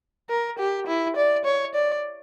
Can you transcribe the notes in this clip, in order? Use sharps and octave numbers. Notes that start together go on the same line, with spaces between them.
A#4
G4
E4
D5
C#5
D5